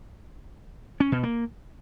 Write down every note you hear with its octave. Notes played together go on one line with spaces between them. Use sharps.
C#4
B2
A#3